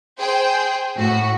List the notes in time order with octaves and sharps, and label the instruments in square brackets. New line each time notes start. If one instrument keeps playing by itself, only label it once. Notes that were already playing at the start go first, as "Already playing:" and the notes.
[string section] G#4 C5 G5
A2 F#4